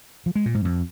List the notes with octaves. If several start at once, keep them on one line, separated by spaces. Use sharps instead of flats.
F3
G#3
A#2
G#2
F2